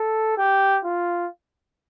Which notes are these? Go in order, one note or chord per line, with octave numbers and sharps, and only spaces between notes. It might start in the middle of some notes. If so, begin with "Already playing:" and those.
Already playing: A4
G4
F4